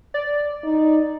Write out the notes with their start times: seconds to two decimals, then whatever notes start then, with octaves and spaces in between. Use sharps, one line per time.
0.14 D5
0.64 D#4